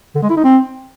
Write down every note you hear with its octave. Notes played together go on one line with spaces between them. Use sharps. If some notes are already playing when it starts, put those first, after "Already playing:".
D3
G#3
E4
D#4
C4